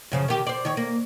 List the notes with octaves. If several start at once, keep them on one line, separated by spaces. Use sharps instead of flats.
F#2 C#3 F3
D#3 G4
C5 D5
D#3 C#5
A#3